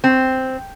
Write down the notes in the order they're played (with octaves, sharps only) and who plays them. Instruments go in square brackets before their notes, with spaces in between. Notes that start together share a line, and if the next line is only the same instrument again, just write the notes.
[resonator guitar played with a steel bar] C4